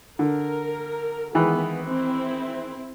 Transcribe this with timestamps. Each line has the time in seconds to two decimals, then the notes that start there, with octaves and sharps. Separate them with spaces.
0.19 D3 A#4
1.35 D#3 E3 G#3 B3
1.84 C4 E4